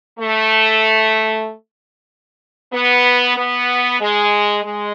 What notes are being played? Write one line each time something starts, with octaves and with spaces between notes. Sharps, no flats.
A3
B3
B3
G#3
G#3